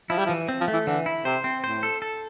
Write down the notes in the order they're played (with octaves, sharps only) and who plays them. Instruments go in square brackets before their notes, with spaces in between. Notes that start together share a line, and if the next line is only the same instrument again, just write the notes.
[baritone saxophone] F3 [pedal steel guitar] E4
[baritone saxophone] G3
F3
[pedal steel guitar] E3
C4
[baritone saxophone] F3
[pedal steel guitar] A3
[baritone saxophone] E3
[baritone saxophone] D3 [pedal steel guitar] E3
[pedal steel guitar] E4
[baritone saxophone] C3 [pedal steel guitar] C5
[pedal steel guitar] C4
[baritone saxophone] A2 [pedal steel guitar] C5
[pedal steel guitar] A4
A4